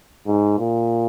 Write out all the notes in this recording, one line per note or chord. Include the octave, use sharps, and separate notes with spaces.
G#2
A#2